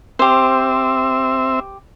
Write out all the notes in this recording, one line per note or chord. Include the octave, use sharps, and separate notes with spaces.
C4 G4 C5 E5